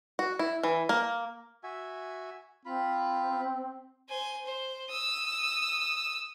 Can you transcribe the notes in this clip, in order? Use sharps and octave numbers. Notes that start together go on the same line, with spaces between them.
F#4
E4
E3
A#3
F#4 E5 G#5
C4 F4 B5
C5 G#5
C5
D#6 E6